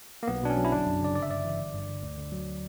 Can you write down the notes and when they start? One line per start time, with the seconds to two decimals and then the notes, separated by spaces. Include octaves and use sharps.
0.23 A#3
0.27 B1 B3
0.43 B2 D4
0.50 C#4
0.57 F#3
0.65 E4
0.71 G1 D4
0.86 F#2
1.01 C#3 D5
1.15 G1 D5
1.22 E5
1.30 G2 D5
1.45 E3
1.59 G1
1.74 G2
1.89 D3
2.02 D2
2.17 D3
2.32 F#3